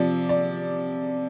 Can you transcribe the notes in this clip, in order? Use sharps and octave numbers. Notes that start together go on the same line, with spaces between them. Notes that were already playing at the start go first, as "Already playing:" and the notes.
Already playing: C3 F3 D5
D5